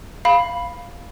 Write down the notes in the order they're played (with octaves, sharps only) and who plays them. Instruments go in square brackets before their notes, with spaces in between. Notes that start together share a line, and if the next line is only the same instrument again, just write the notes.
[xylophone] F5 B5